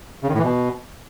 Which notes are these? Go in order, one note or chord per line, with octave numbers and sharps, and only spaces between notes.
C#3
D#3
A2
E3
B2